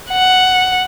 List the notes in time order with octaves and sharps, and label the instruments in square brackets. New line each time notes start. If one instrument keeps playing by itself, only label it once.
[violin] F#5